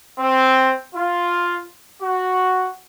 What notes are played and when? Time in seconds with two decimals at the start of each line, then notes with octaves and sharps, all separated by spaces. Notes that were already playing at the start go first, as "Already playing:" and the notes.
0.17 C4
0.93 F4
2.01 F#4